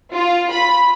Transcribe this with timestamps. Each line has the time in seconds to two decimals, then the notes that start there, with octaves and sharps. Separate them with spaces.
0.14 F4
0.51 B5